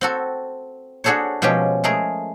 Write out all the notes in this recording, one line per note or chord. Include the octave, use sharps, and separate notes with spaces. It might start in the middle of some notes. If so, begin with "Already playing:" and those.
C4 F#4 A4
D4 F#4 G#4 A4 C5 C#5
B2 F3 G#3 C#4 G4
G#3 A3 G#4 A#4